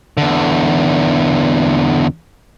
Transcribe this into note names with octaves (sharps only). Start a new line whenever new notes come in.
E2 D3